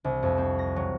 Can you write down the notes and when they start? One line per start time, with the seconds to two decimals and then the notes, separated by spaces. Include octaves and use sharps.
0.04 C2
0.23 F2
0.38 C4
0.59 A#6
0.76 F#3